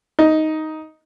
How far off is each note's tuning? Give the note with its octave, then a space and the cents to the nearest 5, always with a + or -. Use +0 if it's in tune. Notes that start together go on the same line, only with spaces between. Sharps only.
D#4 +5